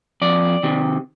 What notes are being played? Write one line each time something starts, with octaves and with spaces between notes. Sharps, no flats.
F2 D5
C3 D#3